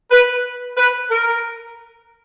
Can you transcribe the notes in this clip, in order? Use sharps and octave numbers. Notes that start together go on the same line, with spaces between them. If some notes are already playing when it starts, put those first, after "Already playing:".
B4
B4
A#4